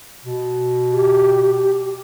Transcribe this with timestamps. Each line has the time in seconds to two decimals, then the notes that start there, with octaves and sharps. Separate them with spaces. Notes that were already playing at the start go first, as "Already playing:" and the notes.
0.25 B2
0.93 G4